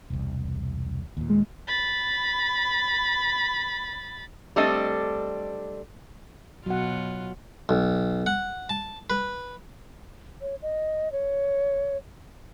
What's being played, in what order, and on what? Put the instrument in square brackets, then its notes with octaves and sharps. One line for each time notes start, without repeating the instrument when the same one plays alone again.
[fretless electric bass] E1 C2
D#2 A#2
[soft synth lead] G#3
[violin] B5 A6
[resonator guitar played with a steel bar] G3 A3 C4 D4 A4 D#5
[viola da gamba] B2 F4 [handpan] F#3 F#5
[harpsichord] B1
F#5
A5
B4
[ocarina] C#5
D#5
C#5